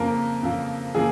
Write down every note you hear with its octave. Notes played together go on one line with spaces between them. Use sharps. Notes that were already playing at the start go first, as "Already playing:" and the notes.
Already playing: F2 C#3 F3 A#3 A#4
F2 C#3 F3 A#3
C#3 F3 A#3 G#4